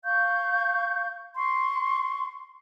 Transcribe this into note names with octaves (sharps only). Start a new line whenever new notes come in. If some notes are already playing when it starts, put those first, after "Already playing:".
F5 C#6 G6
C6 C#6